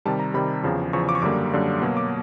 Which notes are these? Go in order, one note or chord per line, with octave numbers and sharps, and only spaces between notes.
C3 D#3 G3 A5
A#5
C3 D#3 G3 B5
E2 C#3 F3
E2 C#3 F3 C#6
D6
C#6
F#2 D3 G3 A#3 D6
F#2 D3 G3 A#3
B2 F#3 A#3
D6